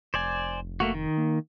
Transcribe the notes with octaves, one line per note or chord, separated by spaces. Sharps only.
F1 C5 D5 G#5
A3 A#3 F#4
D#3
A#3